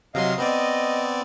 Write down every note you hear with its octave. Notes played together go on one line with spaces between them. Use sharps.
C3 F#3 D#5 F5 C6
B3 C4 D5 D#5